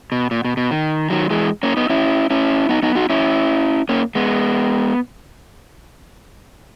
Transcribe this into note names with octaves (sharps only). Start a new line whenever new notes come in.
B2
A#2
B2
B2
D#3
D#3 F#3
E3 G#3
A#3 C#4
B3 D#4
C#4 E4
C#4 E4
B3 D#4
B3 D#4
D#4 F#4
C#4 E4
A#3 C#4
G#3 B3